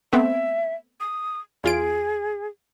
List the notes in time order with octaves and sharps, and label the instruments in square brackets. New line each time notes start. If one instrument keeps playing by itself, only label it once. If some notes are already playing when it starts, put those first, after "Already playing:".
[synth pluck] A3 B3 C4 [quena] E5
[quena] D#6
[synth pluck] E2 F4 D7 [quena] G#4